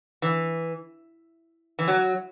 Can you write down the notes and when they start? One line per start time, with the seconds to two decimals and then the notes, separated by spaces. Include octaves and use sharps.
0.22 E3
1.79 E3
1.88 F#3